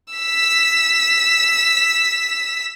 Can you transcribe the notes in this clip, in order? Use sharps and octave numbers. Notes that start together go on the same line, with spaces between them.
E6 B6